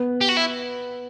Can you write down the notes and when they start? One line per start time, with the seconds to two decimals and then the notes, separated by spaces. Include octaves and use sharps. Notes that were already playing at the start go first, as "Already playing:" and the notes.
Already playing: B3
0.21 G4
0.29 F#4
0.37 E4